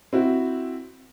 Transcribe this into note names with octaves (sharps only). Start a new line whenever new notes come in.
C4 E4 F#4